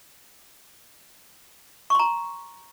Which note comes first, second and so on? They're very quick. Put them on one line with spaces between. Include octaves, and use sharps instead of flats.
C#6 C6 A#5